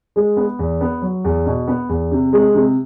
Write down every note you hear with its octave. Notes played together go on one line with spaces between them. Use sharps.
G#3
B3
E2
B3
F#3
E2
B2
B3
E2
C3
G#3
C3